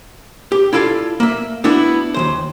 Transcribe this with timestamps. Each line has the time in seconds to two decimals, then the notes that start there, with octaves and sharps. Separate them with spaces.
0.52 G4
0.73 E4 F4 A4 D5 F5
1.20 A#3 E5
1.64 B3 D4 E4 F#4
2.14 D#2 E3 C5